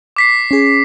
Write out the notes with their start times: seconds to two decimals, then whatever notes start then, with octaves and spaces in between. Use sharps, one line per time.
0.16 D6 B6 C7
0.51 C#4 G#4